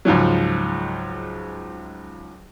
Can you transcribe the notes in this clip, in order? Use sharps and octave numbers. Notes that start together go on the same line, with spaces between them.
C#2 G#2 F3 F#3